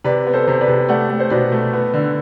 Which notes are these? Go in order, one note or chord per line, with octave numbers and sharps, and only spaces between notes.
C3 B4 D5
B3
A4 C5
C3
B4 D5
C3
A3 D5 F#5
A3
C5
B2 B4 D5
A3
B3
D3